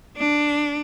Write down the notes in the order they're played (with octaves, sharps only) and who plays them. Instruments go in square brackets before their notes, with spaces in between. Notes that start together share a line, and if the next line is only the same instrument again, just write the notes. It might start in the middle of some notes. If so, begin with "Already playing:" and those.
[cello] D4